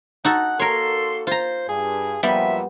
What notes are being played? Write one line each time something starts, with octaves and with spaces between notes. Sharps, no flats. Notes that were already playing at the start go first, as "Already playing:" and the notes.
D#4 F#4 A4 F#5
A#3 F#4 A4 A#4 C#5 C6
F4 C5 A#5
G2 G#4
F#2 A#2 F3 G3 B3 E5